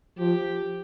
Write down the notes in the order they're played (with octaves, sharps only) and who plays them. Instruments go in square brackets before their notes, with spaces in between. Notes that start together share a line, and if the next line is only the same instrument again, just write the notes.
[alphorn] F3 [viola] G4